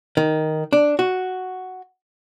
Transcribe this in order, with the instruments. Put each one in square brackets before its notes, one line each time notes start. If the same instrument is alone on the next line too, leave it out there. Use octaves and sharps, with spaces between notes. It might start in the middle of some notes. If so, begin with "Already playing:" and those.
[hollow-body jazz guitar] D#3
D4
F#4